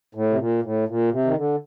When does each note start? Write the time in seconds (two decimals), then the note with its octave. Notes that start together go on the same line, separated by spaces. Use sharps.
0.15 A2
0.30 C3
0.39 A#2
0.63 A2
0.88 A#2
1.11 C3
1.25 D#3
1.36 D3